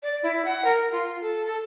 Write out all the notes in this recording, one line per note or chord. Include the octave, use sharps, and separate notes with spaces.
D5
E4
F#5
A#4
F4
A4
A4